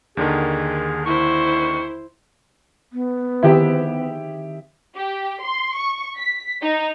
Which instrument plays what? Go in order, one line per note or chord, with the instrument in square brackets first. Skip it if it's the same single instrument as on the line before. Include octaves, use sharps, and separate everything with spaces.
[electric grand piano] D#2 D3 D#3 [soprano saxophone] G#4
[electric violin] E4 C5 [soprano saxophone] C#6
[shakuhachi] B3
[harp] D#3 C4 G#4 [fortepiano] E4 G4 E5
[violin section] G4
C6
C#6
B6
D#4